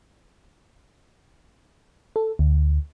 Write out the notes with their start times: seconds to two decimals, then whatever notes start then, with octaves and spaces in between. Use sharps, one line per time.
2.16 A4
2.39 D2